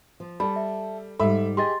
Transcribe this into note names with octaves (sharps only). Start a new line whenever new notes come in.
F3
G3 A4 B5
E5
G#2 G3 A4 E5 B5
G4 G#4 D#5 C6 A6